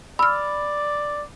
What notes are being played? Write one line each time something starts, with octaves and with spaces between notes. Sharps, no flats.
D5 B5 E6 F6